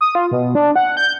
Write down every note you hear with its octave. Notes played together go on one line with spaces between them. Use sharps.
D#6
F4
B2
D4
F#5
G6